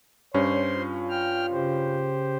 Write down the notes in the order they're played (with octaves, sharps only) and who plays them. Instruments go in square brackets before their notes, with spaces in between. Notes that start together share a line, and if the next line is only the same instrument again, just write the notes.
[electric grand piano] G2 C#4 [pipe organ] C5 C6 [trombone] C#5
[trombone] F4
[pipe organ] G5 F6
C#3 G4 C5